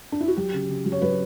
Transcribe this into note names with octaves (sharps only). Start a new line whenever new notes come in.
D4
E4
F#4
F#3 G4
C#3
C#3
F#3
C#5
F#3 B4